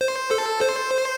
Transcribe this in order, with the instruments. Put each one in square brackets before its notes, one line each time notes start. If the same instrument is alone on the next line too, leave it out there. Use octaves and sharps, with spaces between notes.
[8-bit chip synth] C5
A4
C5